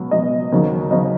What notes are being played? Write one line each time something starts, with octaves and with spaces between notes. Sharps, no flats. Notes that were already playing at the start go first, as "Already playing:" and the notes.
Already playing: C#2 B2 F#3
C#2 B2 F#3 D#5
D#2 C#3 F#3
C#3 F#3 D#5